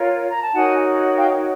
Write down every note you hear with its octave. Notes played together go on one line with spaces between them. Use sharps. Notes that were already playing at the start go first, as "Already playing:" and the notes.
Already playing: F4 A#4 C#5
A#5
A5
D#4 F#4 A#4 C#5 F#5 G#5
F5 G5